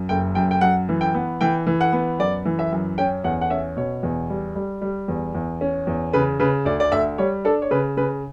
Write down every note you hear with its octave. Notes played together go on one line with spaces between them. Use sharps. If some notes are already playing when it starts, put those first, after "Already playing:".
Already playing: F#2
F#1 G5
F#2 G5
G5
F#2 F#5
E3
G5
B3
E3 G5
E3
F#5
B3
F#2 D5
E3
E5
F#2
C#4 G5
E2 F#5
F#5
C#4 E5
B2 C#5
E2
G3
G3
G3
E2
E2
C#4
E2
C#3 B4
C#3 B4
D2 D5
D5
D2 E5
G3 C#5
D4 A4
C#5
C#3 B4
C#3 B4